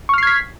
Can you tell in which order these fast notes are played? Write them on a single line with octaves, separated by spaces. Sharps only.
C#6 F6 C7 G#6 B6